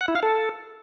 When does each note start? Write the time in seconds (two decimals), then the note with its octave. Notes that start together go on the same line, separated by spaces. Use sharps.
0.01 F#5
0.08 E4
0.15 F5
0.23 A4